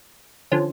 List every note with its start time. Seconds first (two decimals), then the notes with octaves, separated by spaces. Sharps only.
0.52 D3 F3 C#4